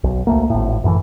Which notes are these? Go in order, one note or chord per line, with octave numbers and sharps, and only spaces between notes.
B1
D2 A3 A#3
G#1 A2
F#2 A2 C3 E3